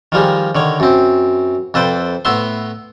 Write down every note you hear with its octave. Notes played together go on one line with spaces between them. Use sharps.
D#3 F3 G3 G#3
D3 D#3 C#5
F#2 C4
F2 A4 B4 C5 G5
A2 B3 E5 C6